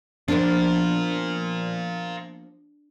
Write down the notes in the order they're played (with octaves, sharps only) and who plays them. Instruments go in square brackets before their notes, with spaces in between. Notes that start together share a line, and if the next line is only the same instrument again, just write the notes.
[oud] F3 A#3 B3 [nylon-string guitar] D4 [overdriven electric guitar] F4 A#4